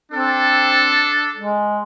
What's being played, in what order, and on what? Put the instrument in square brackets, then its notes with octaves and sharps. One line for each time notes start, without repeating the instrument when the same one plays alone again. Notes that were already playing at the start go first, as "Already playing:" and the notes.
[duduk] C4 [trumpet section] D4 A4
[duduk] G#3